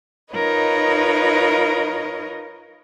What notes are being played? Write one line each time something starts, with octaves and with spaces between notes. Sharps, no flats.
D#4 F4 A#4 B4 C#5 D#5